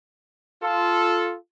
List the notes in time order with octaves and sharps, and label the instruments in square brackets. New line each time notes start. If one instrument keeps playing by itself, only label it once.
[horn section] F4 A4